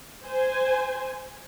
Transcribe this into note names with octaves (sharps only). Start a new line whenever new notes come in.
C5 G#5